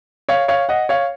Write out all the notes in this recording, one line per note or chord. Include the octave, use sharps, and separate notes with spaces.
C#5 F5
C#5 F5
D#5 F#5
C#5 F5